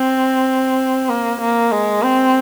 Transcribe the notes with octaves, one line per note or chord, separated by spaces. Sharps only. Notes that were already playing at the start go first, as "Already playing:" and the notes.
Already playing: C4
A#3
A#3
G#3
C4